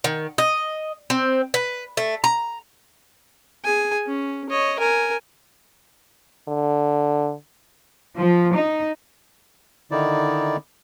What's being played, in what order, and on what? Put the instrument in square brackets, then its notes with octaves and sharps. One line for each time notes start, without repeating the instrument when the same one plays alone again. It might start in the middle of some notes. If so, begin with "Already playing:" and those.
[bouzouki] D#3
D#5
C4
B4
A3
A#5
[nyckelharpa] G#4 G#5
C#4
C#5 D#5
A#4 G#5
[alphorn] D3
[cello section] F3
D#4
[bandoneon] D3 D#3 D#4 E4 D5